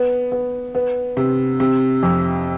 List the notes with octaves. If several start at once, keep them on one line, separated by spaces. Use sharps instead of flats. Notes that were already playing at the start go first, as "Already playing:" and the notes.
Already playing: B3
B3
B3
C3
C3
F2